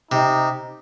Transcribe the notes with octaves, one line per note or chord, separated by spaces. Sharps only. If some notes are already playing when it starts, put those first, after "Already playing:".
C3 D#4